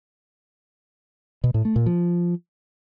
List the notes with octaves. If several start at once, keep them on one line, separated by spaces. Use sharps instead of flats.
B2
A2
A3
A#2
F3